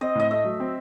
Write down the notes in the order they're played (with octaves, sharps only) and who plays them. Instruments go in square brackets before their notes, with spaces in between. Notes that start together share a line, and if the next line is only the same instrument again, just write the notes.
[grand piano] C4 [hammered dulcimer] D#5
[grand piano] A2 [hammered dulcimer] D#5
[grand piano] A3 [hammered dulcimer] E5
[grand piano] F#3
C4